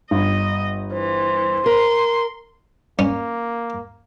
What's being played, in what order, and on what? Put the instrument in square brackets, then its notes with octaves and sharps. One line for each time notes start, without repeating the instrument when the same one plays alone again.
[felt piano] G1 [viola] D#5
[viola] E3 [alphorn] C5
[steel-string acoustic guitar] A#4 [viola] C6
[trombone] A#3 [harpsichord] C#4